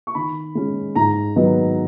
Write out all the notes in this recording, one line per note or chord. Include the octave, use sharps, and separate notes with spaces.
C#6
D#3 B5
G#3 C#4
G#2 A#5
D#3 F#3 B3 D#4